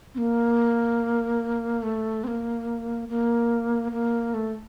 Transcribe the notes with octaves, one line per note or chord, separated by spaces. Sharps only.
C4
A#3
A3
C4
A#3
A#3
A#3
A3